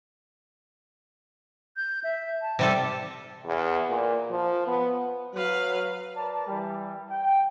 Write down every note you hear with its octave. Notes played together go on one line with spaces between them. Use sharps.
G6
E5
A5
C3 G3 A4
E2
A#2
F3
B3
F#3 B4 F5
A#4 B4 D5 A5
E3 G3
G5